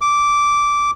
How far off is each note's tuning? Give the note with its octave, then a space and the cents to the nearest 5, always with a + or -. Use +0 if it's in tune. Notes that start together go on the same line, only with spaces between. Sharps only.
D6 -10